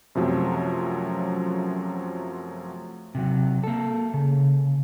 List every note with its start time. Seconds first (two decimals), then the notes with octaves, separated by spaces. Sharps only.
0.15 F#2 C3 F3 F#3 A3 C#4
3.15 C3 F#3
3.64 A#3 A4
4.14 C#3